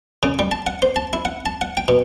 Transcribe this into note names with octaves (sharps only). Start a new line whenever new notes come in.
C#3
G3
A5
F#5
C5
A5
E4
F#5
A5
F#5
G5
B2